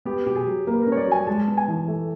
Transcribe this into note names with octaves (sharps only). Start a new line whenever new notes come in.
B3 G4
B2 G4
G#4
F#3
A#3
B4
A#4
C#4
C#5
D5
F#3 G#5
G#3 A5
B3
G#5
E3
A3